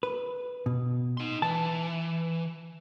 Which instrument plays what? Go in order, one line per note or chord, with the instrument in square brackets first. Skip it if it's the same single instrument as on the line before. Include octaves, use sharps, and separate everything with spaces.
[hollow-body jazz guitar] B4
B2
[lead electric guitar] D#4 C6
[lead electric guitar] E3 [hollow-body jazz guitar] A5